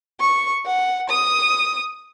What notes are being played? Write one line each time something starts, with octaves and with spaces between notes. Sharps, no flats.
C#6
F#5
D#6